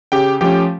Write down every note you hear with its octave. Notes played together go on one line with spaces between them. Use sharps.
C#3 G4 G5
F3 A3 C#4 G4 G5